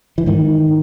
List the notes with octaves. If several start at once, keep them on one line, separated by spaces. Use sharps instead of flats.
E3
G#2 D#3